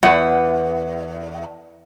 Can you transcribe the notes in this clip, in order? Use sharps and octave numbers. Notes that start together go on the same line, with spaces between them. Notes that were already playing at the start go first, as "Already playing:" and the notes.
E2 B4 F#5